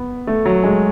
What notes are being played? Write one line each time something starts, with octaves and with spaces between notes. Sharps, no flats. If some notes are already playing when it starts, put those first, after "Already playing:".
Already playing: B3
A3
F#3
G#3